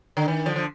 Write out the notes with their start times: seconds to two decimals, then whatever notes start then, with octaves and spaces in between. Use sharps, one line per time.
0.17 D3
0.28 D#3
0.46 D3 F3
0.56 F3